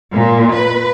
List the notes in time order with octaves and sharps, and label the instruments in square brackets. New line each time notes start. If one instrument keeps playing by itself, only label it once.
[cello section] A#2
B4